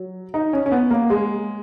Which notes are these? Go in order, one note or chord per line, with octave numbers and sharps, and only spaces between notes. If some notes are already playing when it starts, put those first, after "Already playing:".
Already playing: F#3
D#4
C#4
C#4
B3
A#3
G#3